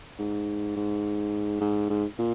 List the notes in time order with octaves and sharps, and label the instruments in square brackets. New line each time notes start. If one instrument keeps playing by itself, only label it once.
[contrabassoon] G#2
G#2
G#2
G#2
A#2